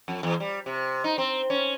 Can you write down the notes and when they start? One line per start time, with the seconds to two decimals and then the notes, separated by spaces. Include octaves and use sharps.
0.08 F2
0.23 E2
0.40 G3
0.66 C3
1.04 D#4
1.18 C4
1.50 C#4